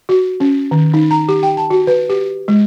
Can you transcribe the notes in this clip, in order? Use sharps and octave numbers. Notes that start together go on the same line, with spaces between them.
F#4
C#4
D#3
D#4
A#5
G4
G5
A5
F#4
B4
G4
G#3